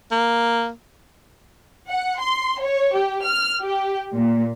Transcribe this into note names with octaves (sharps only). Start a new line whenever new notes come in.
A#3
F#5
C6
C#5
G4
F6
G4
A#2